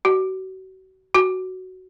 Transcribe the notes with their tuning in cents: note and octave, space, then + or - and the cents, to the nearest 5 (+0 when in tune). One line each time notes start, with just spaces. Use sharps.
F#4 +35
F#4 +5